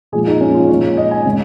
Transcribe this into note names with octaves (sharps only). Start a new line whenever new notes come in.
A#2 F3 G#3 G#4
D#4
C#4
F4
A#2 G#3 C#5
D#5
G#5
C#3 G#3